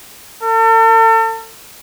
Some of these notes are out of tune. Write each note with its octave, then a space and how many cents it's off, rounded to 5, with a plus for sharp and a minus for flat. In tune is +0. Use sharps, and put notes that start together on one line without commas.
A4 +40